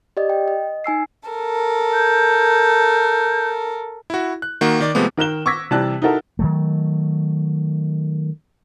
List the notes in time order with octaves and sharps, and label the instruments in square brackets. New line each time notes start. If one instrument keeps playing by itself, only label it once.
[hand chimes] G4 D5 D#5
G5
D#5
D#4 G#5 E6 C7
[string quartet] A4 A#4
[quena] G6
[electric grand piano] E4 F#4
F#6
D#3 A#3 F#4
D#3 D5 D6
C3 F3 G#3 A3 B3
[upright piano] D#3 A#4 F#6 E7 G7
C#6 D6 E6 G#6 A#6 B6
C3 E3 G3 A5 F#6
D#4 E4 F#4 A4 A#4 E5
[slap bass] D#3 F#3 A3